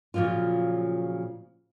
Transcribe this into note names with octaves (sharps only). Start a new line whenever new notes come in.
A#2 C#3 F3 F#3 F4